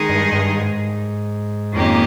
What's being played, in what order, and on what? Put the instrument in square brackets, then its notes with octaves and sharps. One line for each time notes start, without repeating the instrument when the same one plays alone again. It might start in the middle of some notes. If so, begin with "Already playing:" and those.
Already playing: [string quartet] D#3 G#3 D#4 G#4
[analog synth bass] G2
G2
G#2
[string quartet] F2 D#3 A#3 C#4 G4